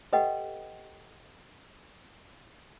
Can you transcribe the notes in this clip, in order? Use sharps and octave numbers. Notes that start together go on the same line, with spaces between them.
G4 A4 B4 D#5 F#5 G5